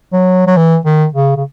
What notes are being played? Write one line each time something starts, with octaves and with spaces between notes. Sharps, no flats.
F#3
F#3
E3
D#3
C#3
C#3